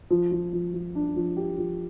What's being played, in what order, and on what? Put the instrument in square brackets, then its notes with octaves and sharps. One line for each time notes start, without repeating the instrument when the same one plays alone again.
[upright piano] F3
F3
F3
F3
D4
F3
G4
F3